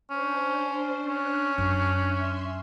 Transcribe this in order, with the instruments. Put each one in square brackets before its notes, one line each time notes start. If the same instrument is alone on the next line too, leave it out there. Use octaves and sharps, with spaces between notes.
[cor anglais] C#4 [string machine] D4 C5
[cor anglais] C#4 [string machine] D4 F#6
[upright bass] F#2
[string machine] E5 C6